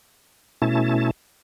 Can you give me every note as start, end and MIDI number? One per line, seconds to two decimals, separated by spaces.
0.62 1.11 47
0.62 1.11 57
0.62 1.11 61
0.62 1.11 64
0.62 1.11 81